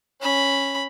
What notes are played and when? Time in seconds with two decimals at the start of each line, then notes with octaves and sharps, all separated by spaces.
0.21 C#4 B5